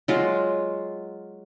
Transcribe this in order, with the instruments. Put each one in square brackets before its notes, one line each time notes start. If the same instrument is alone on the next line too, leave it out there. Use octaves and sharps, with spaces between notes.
[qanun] F#3 G#3 F4